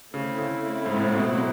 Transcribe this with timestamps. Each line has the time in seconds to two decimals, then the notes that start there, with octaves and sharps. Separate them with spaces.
0.13 C#3 A3 C4 E4
0.39 C#3
0.86 G#2
0.96 A2
1.06 A#2
1.15 B2
1.34 F#3